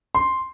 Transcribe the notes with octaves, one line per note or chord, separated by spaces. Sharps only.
C6